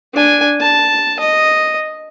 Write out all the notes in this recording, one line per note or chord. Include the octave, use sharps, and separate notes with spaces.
D4 G#5
A5
D#5